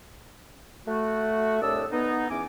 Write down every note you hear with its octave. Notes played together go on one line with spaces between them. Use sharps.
A3 F#4
C2 A2 D4 D5 D#5 E6
B3 D#4
E2 E3 C#4 G#5 D6